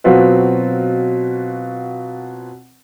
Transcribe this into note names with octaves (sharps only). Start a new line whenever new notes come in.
B2 F#3 C4 F4 B4